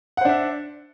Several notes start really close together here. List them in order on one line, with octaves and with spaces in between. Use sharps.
F#5 C5 D4 E5